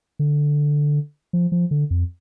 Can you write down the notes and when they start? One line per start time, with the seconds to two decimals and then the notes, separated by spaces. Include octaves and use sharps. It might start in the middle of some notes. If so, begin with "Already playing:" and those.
0.19 D3
1.33 F3
1.52 F3
1.71 D3
1.91 F2